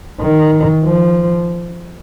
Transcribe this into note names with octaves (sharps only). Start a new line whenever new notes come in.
D#3
F3